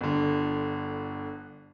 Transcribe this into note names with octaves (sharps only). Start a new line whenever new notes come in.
G1 D3